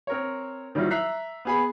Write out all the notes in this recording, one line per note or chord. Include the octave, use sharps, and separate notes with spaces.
C4 A#4 C#5
D#3 F#3 G3 E4 F4
E5 A#5 F#6 B6 C7
B3 G#4 B5